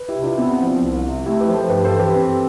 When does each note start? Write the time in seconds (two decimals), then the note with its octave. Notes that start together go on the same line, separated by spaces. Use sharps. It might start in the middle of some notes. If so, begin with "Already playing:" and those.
Already playing: B4
0.08 E4 G4
0.16 C3
0.22 D4 F4
0.38 B3 C4 E4
0.52 C4 E4
0.60 F3
0.67 D4 F4
0.82 C2
1.04 C3
1.26 A3 E4 G4
1.40 G4 B4
1.48 F3
1.55 A4 C5
1.69 G2 G4 B4
1.85 A4 C5
1.92 E3
1.99 G4 B4
2.14 C4